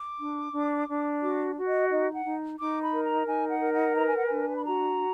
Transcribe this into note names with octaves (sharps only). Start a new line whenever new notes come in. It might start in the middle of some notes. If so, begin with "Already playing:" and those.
Already playing: D6
D4
D4
D4
F#4 D6
F#4
D#5
D#4 D#5
F#5
D#4
D#4 D6
B5
A#4
A#5
D#4 G#5
F#5
A#4
F#5
B4 A#5
G#5
F#5
D4 G#5
B5
F#4 A#5